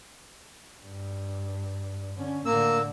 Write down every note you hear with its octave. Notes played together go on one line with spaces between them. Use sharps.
G2
D3 C#4
A2 D3 A#3 E6